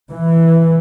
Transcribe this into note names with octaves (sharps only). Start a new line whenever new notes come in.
E3